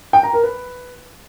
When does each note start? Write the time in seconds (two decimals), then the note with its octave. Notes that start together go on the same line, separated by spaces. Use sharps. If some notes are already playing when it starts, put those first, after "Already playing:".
0.13 G5
0.23 A#5
0.33 A#4
0.43 B4